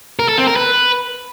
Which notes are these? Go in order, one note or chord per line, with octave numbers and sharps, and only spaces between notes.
A#4
A4
C4
A#4
B4